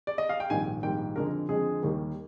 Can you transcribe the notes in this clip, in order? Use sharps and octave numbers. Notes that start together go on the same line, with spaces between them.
D5
D#5
F5
G5
A#1 G#2 D#3 G3 G#5
A#1 G#2 D#3 G3 G5
F2 D3 G#3 A#4
F2 D3 G#3 G#4
D#2 D#3 G3 A#3